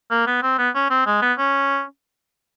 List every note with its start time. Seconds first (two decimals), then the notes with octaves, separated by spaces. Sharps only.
0.11 A#3
0.27 B3
0.42 C4
0.58 B3
0.75 C#4
0.90 C4
1.06 G#3
1.22 B3
1.38 C#4